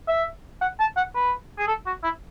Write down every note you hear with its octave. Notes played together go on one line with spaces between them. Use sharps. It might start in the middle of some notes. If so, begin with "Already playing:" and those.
E5
F#5
A5
F#5
B4
G#4
A4
F#4
E4